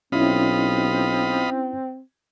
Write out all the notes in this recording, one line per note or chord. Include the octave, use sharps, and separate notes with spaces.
B1 C4 C#4 E4 F4 D#5 B5